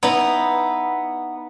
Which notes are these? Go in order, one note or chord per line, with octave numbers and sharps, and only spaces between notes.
B3 D#4 E4